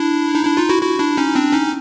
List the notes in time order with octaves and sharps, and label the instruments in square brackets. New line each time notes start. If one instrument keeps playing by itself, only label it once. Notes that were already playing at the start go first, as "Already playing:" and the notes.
Already playing: [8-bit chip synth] D4 E4
D#4
D4 E4
D#4 F4
E4 F#4
E4 F#4
D4 E4
C#4 D#4
C4 D4
C#4 D#4